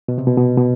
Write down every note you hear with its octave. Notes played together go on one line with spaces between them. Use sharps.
B2
C3
B2
B2
B2